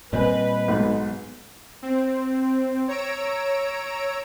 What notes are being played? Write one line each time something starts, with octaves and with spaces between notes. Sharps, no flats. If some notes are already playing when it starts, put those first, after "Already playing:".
A#2 G3 C4 B4 D#5 G#5
B1 G#2
C4
C#5 A#5 E6 D7